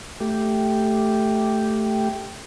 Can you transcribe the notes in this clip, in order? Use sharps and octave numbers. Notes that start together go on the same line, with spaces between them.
A3 G4